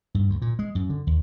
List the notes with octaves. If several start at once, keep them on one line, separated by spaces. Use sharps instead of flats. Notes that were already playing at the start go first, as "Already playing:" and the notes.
G2
D2
A#2
G#3
F#2
D3
D#2